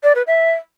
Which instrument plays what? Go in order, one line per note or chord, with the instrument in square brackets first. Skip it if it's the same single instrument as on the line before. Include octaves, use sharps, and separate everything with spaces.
[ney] D5
B4
E5